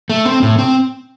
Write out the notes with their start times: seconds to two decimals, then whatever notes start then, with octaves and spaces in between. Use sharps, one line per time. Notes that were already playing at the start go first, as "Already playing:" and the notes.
0.10 A3
0.25 C4
0.43 A2
0.59 C4